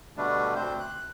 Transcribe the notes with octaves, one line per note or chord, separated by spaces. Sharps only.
B2 D3 G3 A3 D4
D2 C4 C5 G6
F#6